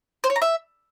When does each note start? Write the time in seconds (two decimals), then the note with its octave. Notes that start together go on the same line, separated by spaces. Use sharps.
0.24 C5
0.30 C#5
0.36 A#5
0.42 E5